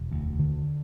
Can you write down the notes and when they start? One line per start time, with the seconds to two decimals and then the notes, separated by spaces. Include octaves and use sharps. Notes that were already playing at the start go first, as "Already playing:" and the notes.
Already playing: E1
0.12 D2
0.39 D3